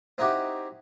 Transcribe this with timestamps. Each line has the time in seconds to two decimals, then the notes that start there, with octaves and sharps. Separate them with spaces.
0.18 C4 D#4 E4 F#4 G4